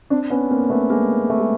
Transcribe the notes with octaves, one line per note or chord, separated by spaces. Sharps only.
C4 D4
B3 C#4
A#3 C4
A3 B3
G#3 A#3
A3
G#3